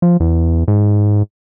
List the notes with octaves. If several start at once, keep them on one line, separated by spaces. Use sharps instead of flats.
F3
E2
G#2